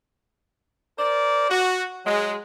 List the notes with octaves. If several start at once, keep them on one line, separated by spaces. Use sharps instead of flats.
A#4 C5 D5
F#4
F#3 G#3